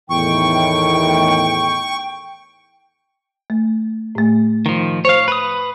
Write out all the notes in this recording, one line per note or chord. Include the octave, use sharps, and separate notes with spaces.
E2 A2 D#3 G5 C#6
A3
A2 A3
D#3 F3
C5 C#5 F5
B4 D#6